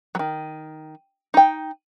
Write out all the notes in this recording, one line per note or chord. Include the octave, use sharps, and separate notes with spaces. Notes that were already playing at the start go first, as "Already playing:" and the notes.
D#3 F#3
D#4 G5